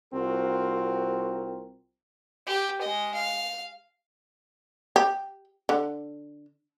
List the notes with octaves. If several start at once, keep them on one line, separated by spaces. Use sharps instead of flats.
C2 C4 F4 F#4 A#4
G4
G#3 D#5
F5
G4
D3